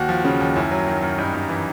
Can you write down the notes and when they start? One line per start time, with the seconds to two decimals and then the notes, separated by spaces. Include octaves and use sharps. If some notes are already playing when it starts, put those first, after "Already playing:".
Already playing: D#2 F#4
0.09 F3
0.25 C#3
0.41 D#2
0.56 F#2 E4
0.71 F#3
0.87 D#3
1.03 F#2
1.18 G2 D#4
1.34 G2
1.49 E3